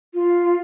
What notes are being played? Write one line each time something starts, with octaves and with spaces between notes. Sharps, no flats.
F4